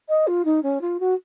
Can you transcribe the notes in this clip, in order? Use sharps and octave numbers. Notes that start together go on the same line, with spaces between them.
D#5
F4
D#4
C#4
F4
F#4